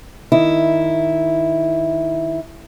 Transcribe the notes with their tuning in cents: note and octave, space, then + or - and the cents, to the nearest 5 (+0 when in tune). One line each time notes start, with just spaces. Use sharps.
D#3 +0 E4 -5